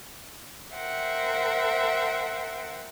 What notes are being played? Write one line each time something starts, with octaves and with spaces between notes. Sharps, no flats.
A#4 C5 E5 F#5 G5